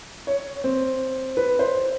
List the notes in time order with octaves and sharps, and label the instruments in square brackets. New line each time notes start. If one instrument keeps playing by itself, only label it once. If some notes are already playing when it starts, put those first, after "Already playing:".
[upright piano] C#5
C4
B4
C5